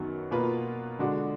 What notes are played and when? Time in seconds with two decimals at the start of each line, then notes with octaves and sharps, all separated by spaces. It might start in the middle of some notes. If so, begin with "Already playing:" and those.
Already playing: F#2 D#3 F#3 B3
0.31 B2 A#3 F4 B4
0.99 D3 G#3 D4 F#4